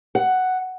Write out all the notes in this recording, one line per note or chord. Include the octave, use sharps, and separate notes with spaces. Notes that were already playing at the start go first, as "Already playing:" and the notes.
F#5